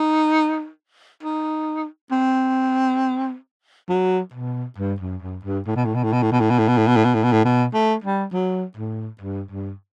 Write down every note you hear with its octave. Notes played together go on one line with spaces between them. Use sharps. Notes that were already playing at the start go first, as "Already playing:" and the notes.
Already playing: D#4
D#4
C4
F#3
B2
G2
F#2
F#2
G2
A2
B2
A2
B2
A2
B2
A2
B2
A2
B2
A2
B2
A2
B2
A2
B2
A2
B2
A2
B2
A3
G3
F#3
A2
G2
G2